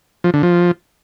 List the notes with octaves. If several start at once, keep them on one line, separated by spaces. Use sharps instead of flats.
F3
D3
F3